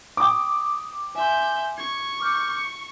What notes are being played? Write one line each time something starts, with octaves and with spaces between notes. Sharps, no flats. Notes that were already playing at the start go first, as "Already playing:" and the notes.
G5 D6 D#6
E5 G#5 C6 G6
C#6 G#6
D6 F6 G6
C#7